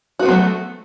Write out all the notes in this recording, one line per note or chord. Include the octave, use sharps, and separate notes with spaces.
F#3 A3 B3 C4 F#4